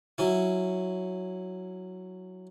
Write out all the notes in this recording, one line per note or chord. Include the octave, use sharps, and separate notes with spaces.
F#3 C#4 E4